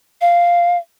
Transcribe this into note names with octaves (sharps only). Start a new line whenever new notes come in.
F5